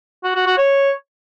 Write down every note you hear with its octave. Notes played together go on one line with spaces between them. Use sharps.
F#4
F#4
F#4
C#5